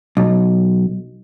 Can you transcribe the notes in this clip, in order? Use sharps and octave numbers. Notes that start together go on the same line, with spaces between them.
B1